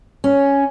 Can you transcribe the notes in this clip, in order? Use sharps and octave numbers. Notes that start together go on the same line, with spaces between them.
C#4